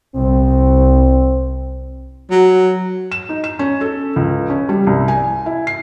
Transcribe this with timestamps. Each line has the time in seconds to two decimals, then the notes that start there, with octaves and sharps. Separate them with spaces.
0.16 C2 C4
2.31 F#3
3.12 E7
3.29 D#4
3.44 E7
3.59 C#4
3.81 A4
4.16 C#2
4.50 C#4
4.69 G3
4.87 C2
5.08 G#5
5.46 E4
5.67 C7